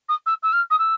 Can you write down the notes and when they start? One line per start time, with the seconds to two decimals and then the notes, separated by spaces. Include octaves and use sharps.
0.08 D#6
0.26 E6
0.42 E6
0.52 F6
0.70 D#6
0.78 E6